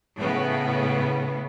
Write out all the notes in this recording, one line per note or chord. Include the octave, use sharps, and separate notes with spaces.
A2 C#3 B3